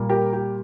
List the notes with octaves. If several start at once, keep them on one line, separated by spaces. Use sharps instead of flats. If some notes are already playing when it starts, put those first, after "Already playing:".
Already playing: A#2 G3 A#3
G4 A#4
G4